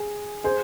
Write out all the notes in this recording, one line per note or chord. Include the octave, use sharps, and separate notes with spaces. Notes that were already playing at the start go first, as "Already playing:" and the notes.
Already playing: G#4
G#4 C5